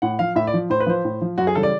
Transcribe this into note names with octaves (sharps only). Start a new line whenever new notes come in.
A2 F#5
F3 F5
A2 E5
D5
F3
A2 C5
B4
F3 C5
A2
F3
F#2 F#4
G#4
C#3 E3 G3 A4
D5